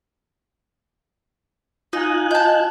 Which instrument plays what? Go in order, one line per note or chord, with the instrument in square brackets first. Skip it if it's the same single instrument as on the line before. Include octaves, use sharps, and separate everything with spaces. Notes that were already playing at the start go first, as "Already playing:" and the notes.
[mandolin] D#4 [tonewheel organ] F4 G#5 F#6
[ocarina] D#5 [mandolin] A5 G6